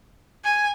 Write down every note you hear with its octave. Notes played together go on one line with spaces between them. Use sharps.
G#5